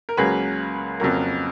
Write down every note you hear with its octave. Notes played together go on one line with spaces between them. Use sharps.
A#4
C#2 C#3 F#3 A#3 G#4 B4
F2 C#3 F#3 A#3